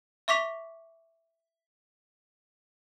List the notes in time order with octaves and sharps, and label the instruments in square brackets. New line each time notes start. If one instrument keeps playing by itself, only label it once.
[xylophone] E5 C#6 D6 B6 F7